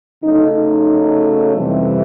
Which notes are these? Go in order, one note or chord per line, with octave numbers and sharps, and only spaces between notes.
C#3 F#3 A3 D#4
D#4
F2 C3 E3 G3